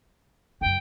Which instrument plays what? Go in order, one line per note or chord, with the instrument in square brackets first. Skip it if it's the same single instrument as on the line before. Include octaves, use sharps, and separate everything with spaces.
[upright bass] F#2 C#3 [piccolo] G5